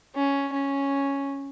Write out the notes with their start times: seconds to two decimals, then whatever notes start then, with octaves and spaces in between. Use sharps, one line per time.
0.16 C#4
0.53 C#4